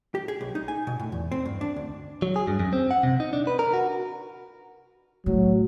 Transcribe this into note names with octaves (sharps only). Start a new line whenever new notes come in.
G4
G#4
B1
D#4
G#5
B2
A2
E2
C4
G2
D4
D2
F#3
G#4
G2
F#2
C4
F#5
C3
D#4
D4
B4
A#4
F#4
A2 F#3